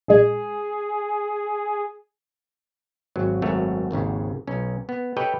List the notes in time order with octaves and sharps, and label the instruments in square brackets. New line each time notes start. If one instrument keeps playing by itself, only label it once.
[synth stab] A#1 G#3 [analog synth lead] G#4
[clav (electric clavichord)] G#1 F#3
G#1 F#2 A3 C#5
G#1 D#2 G#2 C#3
B1 C#4
B3
G4 A4 B4 C#5 D#5 G5